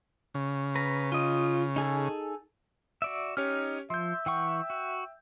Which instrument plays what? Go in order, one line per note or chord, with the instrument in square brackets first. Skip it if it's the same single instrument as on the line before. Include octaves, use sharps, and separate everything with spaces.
[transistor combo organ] C#3
[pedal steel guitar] B4 A#5
F4 D#5
D#4 G#4 A4
F#4 D5 E5
[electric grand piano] C#4 G4 C#5 [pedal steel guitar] D#4 F6
[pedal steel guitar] F3 [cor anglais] E5 [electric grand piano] C6 G6
[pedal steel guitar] E3 F#5 C#6 [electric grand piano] G5
[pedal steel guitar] F#4